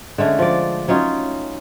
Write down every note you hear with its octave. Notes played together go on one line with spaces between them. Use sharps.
D3 G#3 A3 C#4
F3 D5
F#3 C#4 D#4 F4